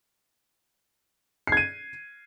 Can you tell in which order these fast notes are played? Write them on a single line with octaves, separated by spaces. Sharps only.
C7 G#6 D#7